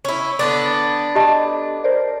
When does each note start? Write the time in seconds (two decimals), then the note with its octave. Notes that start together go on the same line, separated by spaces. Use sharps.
0.05 C#4 E4
0.39 D3 B3 D4
1.15 G4 D#5 A5
1.84 A#4 C5 D5